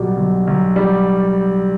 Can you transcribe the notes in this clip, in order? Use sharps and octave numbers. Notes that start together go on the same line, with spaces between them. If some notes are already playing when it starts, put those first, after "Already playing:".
Already playing: B1 B2 G3
B1
B1
G3